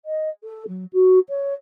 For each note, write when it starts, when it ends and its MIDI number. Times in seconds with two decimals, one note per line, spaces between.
0.05 0.29 75
0.43 0.63 69
0.67 0.84 54
0.93 1.19 66
1.29 1.53 73